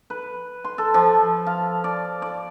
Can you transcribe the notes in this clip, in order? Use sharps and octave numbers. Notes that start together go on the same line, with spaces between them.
B4
C6
A4
F3
F5
D5
D5